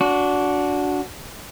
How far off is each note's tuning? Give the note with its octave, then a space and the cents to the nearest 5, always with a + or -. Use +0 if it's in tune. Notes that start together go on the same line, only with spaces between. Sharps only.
D4 -20 F#4 -10